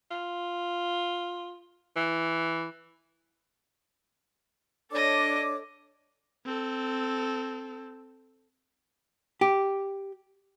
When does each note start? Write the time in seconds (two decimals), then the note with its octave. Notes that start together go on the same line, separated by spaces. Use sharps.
0.11 F4
1.96 E3
4.91 D4 A4 C#5 D#5 D6
6.46 C4 A4
9.41 G4